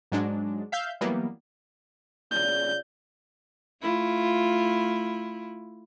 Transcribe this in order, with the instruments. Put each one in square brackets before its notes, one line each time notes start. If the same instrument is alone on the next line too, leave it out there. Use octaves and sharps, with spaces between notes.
[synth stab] G#2 F#3 G#3 D4
E5 F5 G6
E3 F#3 G3 A#3 B3
[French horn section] C#3 F4 D5 [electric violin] G6
[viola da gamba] A3 E4 F4